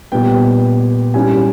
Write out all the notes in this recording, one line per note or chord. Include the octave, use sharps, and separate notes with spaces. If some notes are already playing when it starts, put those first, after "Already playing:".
A#2 G3 B3 G5
G#2 G3 C#4 E4 G#5